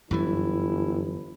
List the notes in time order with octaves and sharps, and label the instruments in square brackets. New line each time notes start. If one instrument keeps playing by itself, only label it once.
[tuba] G1 [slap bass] F#2 E3 G3 [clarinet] E4